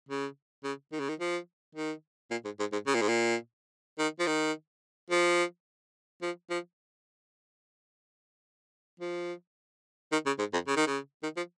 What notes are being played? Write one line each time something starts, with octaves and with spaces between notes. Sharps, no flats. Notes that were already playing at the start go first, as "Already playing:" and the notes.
C#3
C#3
D#3
C#3
D#3
F3
D#3
A#2
G#2
G#2
G#2
C#3
A#2
G#2
A#2
D#3
F3
D#3
F3
F3
F3
F3
D#3
C#3
G#2
F2
C#3
D#3
C#3
D#3
F3